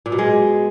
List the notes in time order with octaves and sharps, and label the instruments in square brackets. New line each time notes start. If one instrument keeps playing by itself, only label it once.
[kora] A#2
B2
G#3